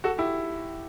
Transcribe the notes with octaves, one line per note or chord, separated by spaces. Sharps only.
F#4 A4
E4 G4